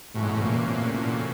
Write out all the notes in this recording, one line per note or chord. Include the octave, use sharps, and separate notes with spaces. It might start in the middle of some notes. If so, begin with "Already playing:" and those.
A2 C3 E3 A3 C#4 F#4
G#2
A2
A#2
A#2
A#2